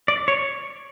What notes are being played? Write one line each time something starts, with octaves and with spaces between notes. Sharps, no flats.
D5
C#5